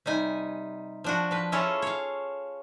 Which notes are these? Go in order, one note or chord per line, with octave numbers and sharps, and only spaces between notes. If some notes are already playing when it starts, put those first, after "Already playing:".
C3 G3 D#4 G#5
F3 D4 F#4
F3 B4
C#4 E4 F4 G#4 A4 C#5
C#5 F5